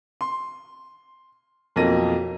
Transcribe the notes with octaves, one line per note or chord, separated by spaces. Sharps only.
C6
B1 F2 A#3 D#5 A#6 D#7